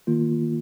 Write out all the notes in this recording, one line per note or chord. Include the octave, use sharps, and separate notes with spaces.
D#3 A#3 F4